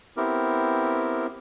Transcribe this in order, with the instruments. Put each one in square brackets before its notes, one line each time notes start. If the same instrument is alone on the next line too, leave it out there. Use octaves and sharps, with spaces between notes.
[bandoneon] B3 C4 E4 G4 A#4